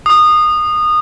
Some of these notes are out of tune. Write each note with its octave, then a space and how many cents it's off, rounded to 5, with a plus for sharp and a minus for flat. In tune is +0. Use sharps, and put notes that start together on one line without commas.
D#6 -20